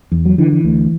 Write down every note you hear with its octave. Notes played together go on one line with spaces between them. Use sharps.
E2
F#3
D3 E3
E3
D2